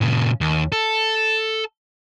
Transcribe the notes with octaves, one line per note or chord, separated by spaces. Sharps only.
A#2 C#3
D#2
A4